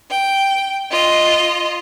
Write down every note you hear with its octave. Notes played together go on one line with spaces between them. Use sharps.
G5
F4 D#5